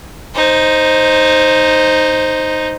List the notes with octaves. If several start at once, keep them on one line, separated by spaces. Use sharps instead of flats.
D#4 C5